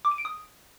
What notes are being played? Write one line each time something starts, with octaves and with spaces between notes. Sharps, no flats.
D6
D#7
D7
D#6